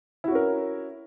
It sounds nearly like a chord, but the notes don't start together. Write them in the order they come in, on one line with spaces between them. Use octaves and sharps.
E4 F#4 C#4 A#4